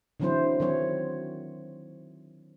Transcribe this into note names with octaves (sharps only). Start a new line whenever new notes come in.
D3 E3 F#3 C4 E4 C5
D#3 F#3 C4 C#5